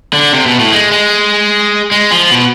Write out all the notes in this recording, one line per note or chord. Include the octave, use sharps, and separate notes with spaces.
D3
C3
B2
A2
G#3
G#3
G#3
F3
B2